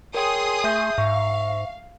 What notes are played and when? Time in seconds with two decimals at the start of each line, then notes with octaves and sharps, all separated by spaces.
0.14 G#4 A#4 C#5 G5 C6 D#6
0.64 A3 E5 G6
0.98 G#2 E5 F5 C#6